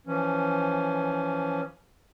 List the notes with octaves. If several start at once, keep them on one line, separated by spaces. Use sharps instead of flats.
E3 F3 C#4